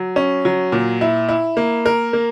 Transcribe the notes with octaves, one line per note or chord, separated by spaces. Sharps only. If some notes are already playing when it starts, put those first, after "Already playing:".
Already playing: F#3
C#4
F#3
A#2
E4
E4
A#3
A#4
A#3